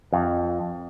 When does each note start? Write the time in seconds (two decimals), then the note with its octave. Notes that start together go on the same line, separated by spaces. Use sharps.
0.13 F2